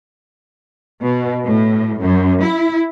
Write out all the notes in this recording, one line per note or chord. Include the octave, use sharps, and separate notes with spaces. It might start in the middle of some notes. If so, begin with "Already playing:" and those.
B2
A2
F#2
E4